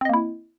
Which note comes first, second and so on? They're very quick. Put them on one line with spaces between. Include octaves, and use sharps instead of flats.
C4 D#5 A#3 E4